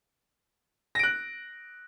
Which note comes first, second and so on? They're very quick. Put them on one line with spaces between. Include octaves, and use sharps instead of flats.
A#6 D7 F#6